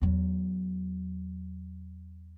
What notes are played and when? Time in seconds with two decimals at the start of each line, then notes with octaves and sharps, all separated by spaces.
0.02 E2 F#3